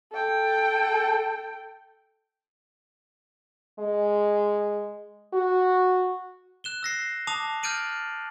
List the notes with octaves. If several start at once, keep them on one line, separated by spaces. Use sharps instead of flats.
A4 G5
G#3
F#4
F#6 E7 G7
E6 A#6 C7
A5 D6 D#6 F7
F6 G6 A6 D7 D#7 F#7